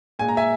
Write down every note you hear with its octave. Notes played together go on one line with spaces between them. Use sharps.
A#2 G#3 G#5
A#5
E5 G#5